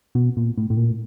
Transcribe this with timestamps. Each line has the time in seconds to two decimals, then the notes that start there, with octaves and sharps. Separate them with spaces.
0.15 B2
0.37 A#2
0.57 A2
0.70 A2
0.77 A#2